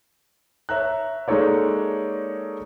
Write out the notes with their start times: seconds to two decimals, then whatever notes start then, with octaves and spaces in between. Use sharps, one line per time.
0.69 C#5 E5 A#5 F#6
1.28 G#3 A#3 D#4 A4 C#5 D5